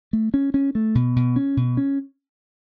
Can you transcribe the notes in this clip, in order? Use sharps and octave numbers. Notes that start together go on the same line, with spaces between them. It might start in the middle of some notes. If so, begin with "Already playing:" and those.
A3
C#4
C#4
A3
B2
B2
C#4
B2
C#4